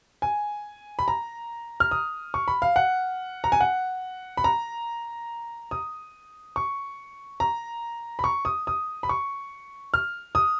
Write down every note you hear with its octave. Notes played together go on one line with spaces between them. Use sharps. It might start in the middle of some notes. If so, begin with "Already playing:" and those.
G#5
B5
A#5
F6
D#6
C#6
B5
F5
F#5
A#5
G#5
F#5
B5
A#5
D#6
C#6
A#5
B5
C#6
D#6
D#6
B5
C#6
F6
D#6